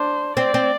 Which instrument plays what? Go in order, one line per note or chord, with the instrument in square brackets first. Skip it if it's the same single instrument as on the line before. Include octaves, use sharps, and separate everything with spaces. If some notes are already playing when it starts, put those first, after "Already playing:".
Already playing: [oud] D4 [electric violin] C5
[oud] C4 [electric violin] D5
[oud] C4